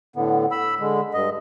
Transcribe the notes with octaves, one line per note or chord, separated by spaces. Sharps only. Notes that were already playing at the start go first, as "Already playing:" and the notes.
A2 D3 B3
B5 E6
D3 G#3
G2 D#5